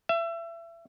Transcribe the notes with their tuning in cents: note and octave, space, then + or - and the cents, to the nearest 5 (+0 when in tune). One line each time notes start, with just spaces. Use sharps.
E5 +30